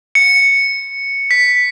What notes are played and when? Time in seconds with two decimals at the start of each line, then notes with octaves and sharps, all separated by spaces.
0.15 C#7
1.31 B6